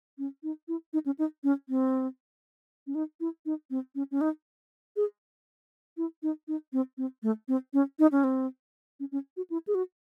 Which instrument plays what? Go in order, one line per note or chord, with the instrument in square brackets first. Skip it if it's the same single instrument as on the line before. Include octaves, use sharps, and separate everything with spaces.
[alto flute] C#4
D#4
E4
D#4
C#4
D#4
C#4
C4
C#4
D#4
E4
D#4
C4
C#4
C#4
D#4
G#4
E4
D#4
D#4
C4
C4
A3
C4
C#4
D#4
C#4
C4
C#4
C#4
F#4
E4
G#4
F#4